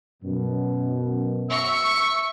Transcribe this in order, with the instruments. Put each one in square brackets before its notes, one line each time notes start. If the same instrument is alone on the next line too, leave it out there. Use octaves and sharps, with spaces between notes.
[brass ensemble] F#2 B2
[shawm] E5 [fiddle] C#6